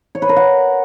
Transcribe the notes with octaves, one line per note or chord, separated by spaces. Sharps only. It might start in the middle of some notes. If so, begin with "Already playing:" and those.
C#5
B4
A#4
F#5